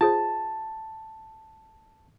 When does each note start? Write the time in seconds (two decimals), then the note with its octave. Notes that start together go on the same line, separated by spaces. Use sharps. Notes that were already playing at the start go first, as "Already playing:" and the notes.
0.01 F4 G#4 C5 A5